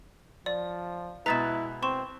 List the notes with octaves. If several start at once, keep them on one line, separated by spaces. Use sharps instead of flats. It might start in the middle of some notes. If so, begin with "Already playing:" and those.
F3 D5
B2 G#3 E4 B4 A#5 A6 E7
C4 C6 C#6 E7